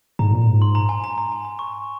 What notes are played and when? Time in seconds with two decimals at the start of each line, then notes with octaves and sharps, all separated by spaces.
0.19 G#2 A#5
0.33 A#2
0.47 G#2
0.62 C6
0.75 A#5
0.89 G#5
1.04 A#5
1.18 A#5
1.32 G#5
1.45 A#5
1.59 C#6